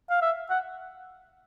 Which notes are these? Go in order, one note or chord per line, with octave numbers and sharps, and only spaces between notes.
F5
E5
F#5